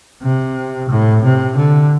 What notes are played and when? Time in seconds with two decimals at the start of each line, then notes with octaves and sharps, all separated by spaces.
0.23 C3
0.89 A2
1.23 C3
1.56 D3